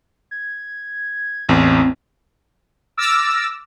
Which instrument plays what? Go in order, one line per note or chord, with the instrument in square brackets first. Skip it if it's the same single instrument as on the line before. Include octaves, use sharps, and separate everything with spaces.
[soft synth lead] G#6
[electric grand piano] A1 E2 [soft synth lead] C4
[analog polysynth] D6 E6 F6 A6 A#6